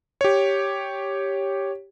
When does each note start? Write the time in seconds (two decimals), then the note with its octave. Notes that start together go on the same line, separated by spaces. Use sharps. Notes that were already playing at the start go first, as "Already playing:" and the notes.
0.21 G4 C#5